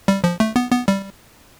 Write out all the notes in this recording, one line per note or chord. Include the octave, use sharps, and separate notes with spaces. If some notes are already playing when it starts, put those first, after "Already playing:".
G3
F3
A3
B3
B3
G3